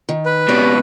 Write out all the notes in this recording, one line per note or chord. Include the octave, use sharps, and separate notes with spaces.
D#3
B4
C#2 B2 G4 C#5 D5